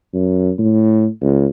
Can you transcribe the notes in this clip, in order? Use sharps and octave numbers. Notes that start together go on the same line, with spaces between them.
F#2
A2
C#2